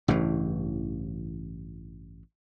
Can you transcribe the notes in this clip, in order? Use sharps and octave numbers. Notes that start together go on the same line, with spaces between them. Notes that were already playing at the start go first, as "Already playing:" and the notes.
A1 G2 C#3 E3